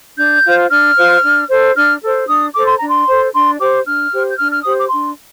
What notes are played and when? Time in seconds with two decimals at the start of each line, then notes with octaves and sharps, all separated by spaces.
0.18 D4 G6
0.45 F4 C5
0.71 D4 F6
0.96 F4 C5
1.23 D4
1.49 A4 C5
1.75 D4 F6
2.02 A4 C5
2.28 D4 D#6
2.54 A4 C5 D6
2.65 C6
2.77 D4 A#5
2.89 C6
3.07 A4 C5
3.33 D4 C6
3.59 G4 C5 D6
3.85 D4 F6
4.12 G4 C5
4.30 G6
4.38 D4 F6
4.52 F6
4.64 G4 C5 D#6
4.78 D6
4.90 D4 C6